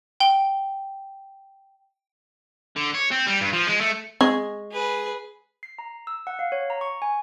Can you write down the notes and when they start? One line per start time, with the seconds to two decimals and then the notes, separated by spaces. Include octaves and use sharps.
0.20 G5 G7
2.76 D3
2.94 C#5
3.11 C4
3.27 G3
3.41 G2
3.53 F3
3.67 G#3
3.81 A3
4.21 G#3 C4 C#6
4.71 G#4 B4
5.63 C7
5.79 A#5
6.07 E6
6.27 F#5
6.39 F5
6.52 C#5
6.70 A#5
6.81 C#6
7.02 G#5